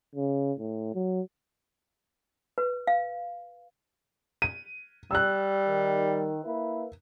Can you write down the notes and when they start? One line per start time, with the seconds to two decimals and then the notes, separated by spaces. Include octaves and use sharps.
0.15 C#3
0.59 A2
0.94 F#3
2.58 B4
2.87 F5
4.42 D#7
5.11 G3 E6 F#6
5.67 D#3
6.44 A#3 E4 B4